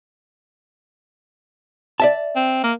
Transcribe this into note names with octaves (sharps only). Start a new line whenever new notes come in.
D5 E5 A5
C4
A#3